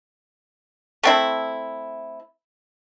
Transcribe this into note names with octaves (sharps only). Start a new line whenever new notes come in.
A3 C4 E4